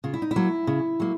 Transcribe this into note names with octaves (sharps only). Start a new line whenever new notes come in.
C#3 F4
E4
D#4
E4
F#3 A#3
C#3
F#3 A#3